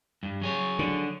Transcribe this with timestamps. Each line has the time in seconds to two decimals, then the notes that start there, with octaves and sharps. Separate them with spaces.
0.23 G2
0.42 F#3 G#4 C#5
0.79 D3